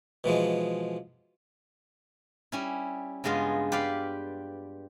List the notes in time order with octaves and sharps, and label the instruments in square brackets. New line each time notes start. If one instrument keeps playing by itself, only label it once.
[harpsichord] B2 E3 F3 G#3
[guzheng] G3 C#4 E4
G2 C#3 G#3 B3 F4
G4 B4 D5 F5